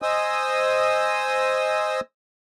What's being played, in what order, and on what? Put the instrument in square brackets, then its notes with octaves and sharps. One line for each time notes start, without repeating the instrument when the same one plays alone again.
[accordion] C5 D#5 G#5 D#6 E6